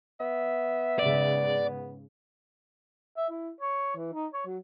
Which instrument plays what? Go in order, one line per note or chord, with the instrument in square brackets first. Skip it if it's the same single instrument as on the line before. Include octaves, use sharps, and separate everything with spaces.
[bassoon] B3 [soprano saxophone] E5
[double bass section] G#2 C#3 [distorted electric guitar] D5
[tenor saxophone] E5
E4
C#5
E3
D#4
C#5
F#3